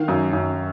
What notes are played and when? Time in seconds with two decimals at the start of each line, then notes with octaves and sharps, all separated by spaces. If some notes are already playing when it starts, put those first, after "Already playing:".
Already playing: D#3 F5
0.08 F#2
0.33 F#2